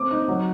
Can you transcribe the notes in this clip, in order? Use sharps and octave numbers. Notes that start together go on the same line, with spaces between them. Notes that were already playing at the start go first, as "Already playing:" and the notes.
Already playing: C4 D6
D#4
F#3